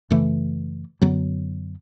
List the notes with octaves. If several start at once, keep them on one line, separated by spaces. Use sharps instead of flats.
F#2 C#3 E3 A3
F#2 D3 F#3 B3